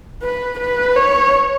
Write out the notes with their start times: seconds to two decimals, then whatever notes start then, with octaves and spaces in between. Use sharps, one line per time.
0.22 B4
0.60 B4
0.96 C#5